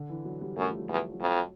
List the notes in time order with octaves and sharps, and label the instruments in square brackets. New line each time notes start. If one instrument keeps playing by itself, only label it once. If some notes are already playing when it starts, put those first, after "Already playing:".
Already playing: [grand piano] D3
E3
F#3
G3
[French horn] F#2 [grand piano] A3
[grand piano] F3
F#3
[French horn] E2 [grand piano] G3
[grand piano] F3
[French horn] F2 [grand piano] F#3